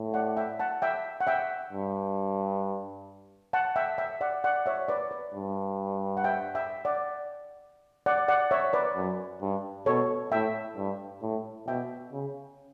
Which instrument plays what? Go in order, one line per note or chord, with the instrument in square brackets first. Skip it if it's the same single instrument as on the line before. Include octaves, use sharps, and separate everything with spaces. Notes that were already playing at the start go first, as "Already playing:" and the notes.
Already playing: [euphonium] A2
[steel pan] D5 F#5
E5 G5
F#5 A5
E5 G5
F#5
E5 G5
[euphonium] G2
[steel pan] F#5 A5
E5 G5
E5 G5
D5 F#5
D5 F#5
C#5 E5
B4 D5
B4
[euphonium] G2
[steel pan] F#5
E5 G5
E5 G5
D5 F#5
D5 F#5
D5 F#5
C#5 E5
B4 D5
[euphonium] F#2
G2
[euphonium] B2 [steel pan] A4 C#5
[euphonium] A2 [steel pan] E5 G5
[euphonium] G2
A2
[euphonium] B2 [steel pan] E5 G5
[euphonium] C#3